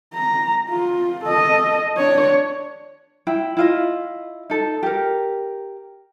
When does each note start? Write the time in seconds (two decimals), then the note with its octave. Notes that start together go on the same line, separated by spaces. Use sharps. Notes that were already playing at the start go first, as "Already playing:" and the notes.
0.14 A#5
0.70 F4
1.24 A4 D#5
1.97 D4 C#5
3.27 E4 G5
3.57 E4 F4 D#5
4.50 D#4 A4
4.83 G4 A#4